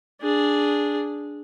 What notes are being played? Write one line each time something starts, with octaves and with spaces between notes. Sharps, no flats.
D4 G#4